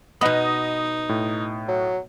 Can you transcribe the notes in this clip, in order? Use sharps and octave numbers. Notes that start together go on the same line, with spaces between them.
B2 B3 D#4 D#5 D#6
A2
F#3